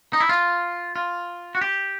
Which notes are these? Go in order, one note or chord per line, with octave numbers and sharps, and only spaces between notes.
D#4
E4
F4
F4
F#4
G4